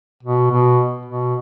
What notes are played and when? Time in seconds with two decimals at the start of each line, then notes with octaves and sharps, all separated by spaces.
0.23 B2
0.51 B2
1.06 B2